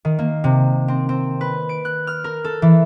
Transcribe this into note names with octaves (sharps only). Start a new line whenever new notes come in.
D#3
A#3
C3
C4
C4
B4
D7
F#6
F6
A#4
A4
E3